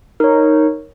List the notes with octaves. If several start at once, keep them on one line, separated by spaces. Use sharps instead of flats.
D#4 A#4 C#5